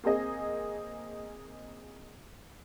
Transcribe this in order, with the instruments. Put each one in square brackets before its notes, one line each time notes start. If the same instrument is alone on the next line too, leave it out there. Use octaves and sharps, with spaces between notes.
[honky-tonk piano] A#3 C4 G#4 D#5